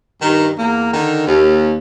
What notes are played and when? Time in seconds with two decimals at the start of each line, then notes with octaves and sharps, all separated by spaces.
0.21 G2 D#3
0.58 E2 A#3
0.94 D3 D#3
1.27 D#2